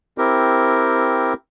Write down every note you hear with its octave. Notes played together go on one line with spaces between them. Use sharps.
C4 E4 G4 A#4